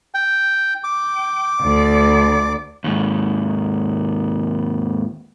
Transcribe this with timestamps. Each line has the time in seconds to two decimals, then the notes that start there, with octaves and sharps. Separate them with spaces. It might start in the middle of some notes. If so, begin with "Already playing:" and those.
0.14 G5
0.84 G5 D6
1.62 D2 D5
2.84 D#2 G#2